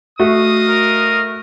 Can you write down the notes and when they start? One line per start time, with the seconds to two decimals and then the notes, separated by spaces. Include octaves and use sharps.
0.19 A3 F#4 D#5 F5 D#6
0.68 A#4